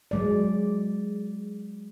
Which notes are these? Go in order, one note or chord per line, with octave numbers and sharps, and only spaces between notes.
F#3 G#3 D5